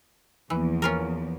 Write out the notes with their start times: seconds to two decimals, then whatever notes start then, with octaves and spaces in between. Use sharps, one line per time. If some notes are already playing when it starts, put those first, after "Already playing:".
0.50 E2 E3 F3 A#3 B3
0.82 C#4 F4 A#4